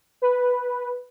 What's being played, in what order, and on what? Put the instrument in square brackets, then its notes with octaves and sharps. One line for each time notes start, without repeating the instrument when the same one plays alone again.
[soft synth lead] B4